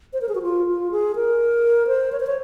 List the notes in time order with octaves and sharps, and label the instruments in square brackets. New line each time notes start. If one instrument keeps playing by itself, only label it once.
[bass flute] C5
A#4
G#4
F#4
F4
F4
G#4
A#4
C5
C#5
C5
C#5